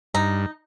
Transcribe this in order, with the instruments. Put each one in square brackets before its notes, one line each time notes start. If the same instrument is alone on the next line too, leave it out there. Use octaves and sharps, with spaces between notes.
[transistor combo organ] G2 [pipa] D#4